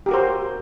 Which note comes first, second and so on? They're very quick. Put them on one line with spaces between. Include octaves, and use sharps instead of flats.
G4 F#4 A#4 C5